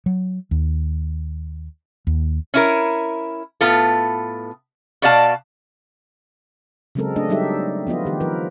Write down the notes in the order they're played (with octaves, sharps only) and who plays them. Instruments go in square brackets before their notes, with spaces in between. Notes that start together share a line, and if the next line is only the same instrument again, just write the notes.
[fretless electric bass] F#3
D#2
D#2
[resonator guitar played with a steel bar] C#4 E4 A#4
A2 B3 F4 A4
B2 F#4 D5 F5 A5
[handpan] C#3 F#3 G#3 C4 A4 A#4
A3 D4 D#5
F#3 G3 D#4 G4 A4 E5
F3 B3 F4 D#5
D#3 G4
F3 A#4 B4